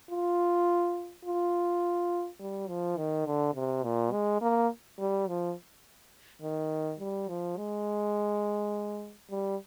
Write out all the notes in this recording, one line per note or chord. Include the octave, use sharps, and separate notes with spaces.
F4
F4
G3
F3
D#3
D3
C3
A#2
G#3
A#3
G3
F3
D#3
G3
F3
G#3
G3